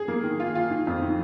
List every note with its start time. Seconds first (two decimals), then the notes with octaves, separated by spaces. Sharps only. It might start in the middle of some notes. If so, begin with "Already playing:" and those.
Already playing: G#4
0.08 A#3
0.23 D#3
0.40 F4
0.55 F4
0.71 D#3
0.87 F2
1.02 D#3